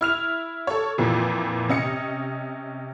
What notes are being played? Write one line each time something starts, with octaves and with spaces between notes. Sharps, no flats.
E4 F6 F7
A4 C#5
F2 A#2 E3
C3 C#4 D#5 C#7